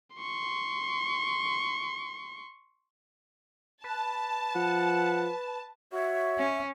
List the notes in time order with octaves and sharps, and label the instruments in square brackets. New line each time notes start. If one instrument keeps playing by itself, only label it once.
[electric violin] C6 C#6
[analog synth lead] B4 [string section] A5
[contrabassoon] F3 [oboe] F#5
[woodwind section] F#4 C#5 [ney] E5
[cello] C#4